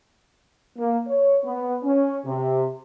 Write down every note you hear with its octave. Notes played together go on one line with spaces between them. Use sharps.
A#3
C#5
B3
C#4
C3